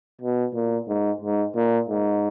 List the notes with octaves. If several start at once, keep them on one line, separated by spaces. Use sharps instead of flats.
B2
A#2
G#2
G#2
A#2
G#2